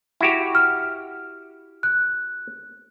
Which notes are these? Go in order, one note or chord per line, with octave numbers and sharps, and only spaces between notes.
E4 F#4 G4
F6
F#6